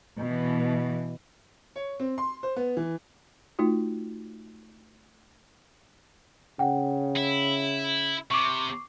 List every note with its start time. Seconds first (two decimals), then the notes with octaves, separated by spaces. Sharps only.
0.19 B2 E3
1.76 C#5
2.00 C4
2.18 C6
2.43 C5
2.56 B3
2.77 E3
3.59 A3 D#4 F4 F#4
6.59 C#3 F#5 G5
7.16 E4
8.31 C3 C#6 D6